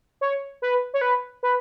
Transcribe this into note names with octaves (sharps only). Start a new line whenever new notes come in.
C#5
B4
C#5
B4
B4